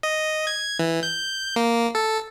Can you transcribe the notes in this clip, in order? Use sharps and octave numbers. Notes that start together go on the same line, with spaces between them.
D#5
G#6
E3
G6
A#3
A4